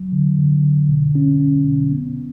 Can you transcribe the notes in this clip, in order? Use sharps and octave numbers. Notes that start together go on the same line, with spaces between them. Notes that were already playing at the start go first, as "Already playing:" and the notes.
Already playing: F#3
D3
D3
D3
B2
C#4
C#4
B2
B3